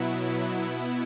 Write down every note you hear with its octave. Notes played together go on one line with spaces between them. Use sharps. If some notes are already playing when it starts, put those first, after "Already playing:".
Already playing: B2 F#3 B3 E4
B2 B3 E4